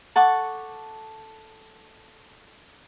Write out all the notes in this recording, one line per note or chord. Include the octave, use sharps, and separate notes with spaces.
A4 F#5 C#6 D6